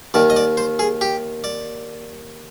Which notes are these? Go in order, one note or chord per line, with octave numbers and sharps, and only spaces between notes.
D#2 D#3 D5
D#5
D5
C5
G#4
G4
D5